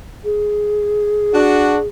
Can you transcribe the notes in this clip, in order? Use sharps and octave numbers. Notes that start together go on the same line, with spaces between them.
G#4
D4 F#4